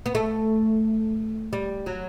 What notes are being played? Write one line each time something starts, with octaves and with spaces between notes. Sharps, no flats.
B3
A3
G3
F#3